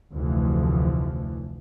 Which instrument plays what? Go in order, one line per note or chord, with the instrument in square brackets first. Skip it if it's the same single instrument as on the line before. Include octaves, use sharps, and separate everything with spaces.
[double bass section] F1 D2 E3 F3